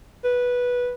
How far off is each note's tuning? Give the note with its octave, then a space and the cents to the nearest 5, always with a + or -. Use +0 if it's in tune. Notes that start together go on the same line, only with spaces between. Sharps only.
B4 -10